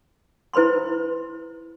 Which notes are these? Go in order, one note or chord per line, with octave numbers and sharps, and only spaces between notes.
E4 B4 C5 B5 C6